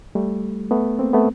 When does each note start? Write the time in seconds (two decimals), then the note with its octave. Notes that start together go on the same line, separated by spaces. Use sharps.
0.15 G3 A3
0.71 A3 B3
0.99 A#3 C4
1.13 A3 B3